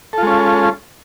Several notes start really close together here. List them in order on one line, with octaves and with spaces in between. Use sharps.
A4 F4 G#3 C#4